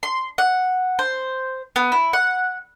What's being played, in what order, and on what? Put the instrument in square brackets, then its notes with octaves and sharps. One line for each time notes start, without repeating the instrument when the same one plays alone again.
[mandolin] C6
F#5
C5
B3
E4
F#5